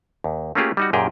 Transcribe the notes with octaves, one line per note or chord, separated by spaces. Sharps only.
D#2
A3 A#3 C#4 F4 G4 G#4
G3 D#4 F#4
F#2 A#2 G4 G#4 A#4 G5